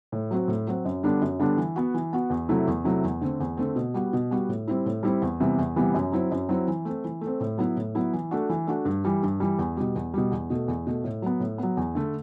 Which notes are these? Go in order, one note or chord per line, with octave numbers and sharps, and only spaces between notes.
A2
F#3 C4 F#4
A2
F#3 C4 F#4
F#2
D3 G3 B3 D4
F#2
D3 G3 B3 D4
E3
B3 F#4
E3
B3 F#4
E2
C3 F#3 A3 E4
E2
C3 F#3 A3 E4
E2
D3 A3 C4
E2
D3 A3 C4
B2
G3 B3 F#4
B2
G3 B3 F#4
A2
G3 C4 E4
A2
G3 C4 E4
E2
C3 E3 G3 B3
E2
C3 E3 G3 B3
F#2
F#3 C4 E4
F#2
F#3 C4 E4
E3
A3 C4
E3
A3
C4
A2
F#3 B3 E4
A2
F#3 B3 E4
E3
A3 D4 F#4
E3
A3 D4 F#4
G2
E3 G3
G2
E3 G3
E2
B2 G3
E2
B2 G3
E2
B2 A3
E2
B2 A3
A2
F#3 B3
A2
F#3 B3
E2
D3 A3